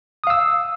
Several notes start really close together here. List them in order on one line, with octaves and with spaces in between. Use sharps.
D#6 F5 E6